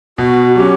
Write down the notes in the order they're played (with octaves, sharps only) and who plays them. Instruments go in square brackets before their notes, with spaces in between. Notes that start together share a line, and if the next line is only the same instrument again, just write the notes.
[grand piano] B2 [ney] F#4
[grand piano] F#3 C#4 [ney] G4